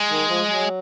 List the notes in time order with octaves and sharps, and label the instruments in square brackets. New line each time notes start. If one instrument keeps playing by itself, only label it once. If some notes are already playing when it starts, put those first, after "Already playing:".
Already playing: [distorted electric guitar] G#3
[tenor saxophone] D#3
F3
F#3